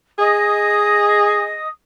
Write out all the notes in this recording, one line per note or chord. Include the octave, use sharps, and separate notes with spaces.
G#4 D#5 D#6